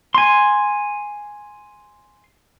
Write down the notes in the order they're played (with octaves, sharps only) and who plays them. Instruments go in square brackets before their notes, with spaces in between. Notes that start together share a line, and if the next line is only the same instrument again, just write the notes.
[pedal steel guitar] G#5 C6